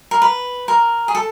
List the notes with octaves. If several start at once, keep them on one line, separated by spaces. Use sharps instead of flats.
A#4
B4
A#4
G#4
A4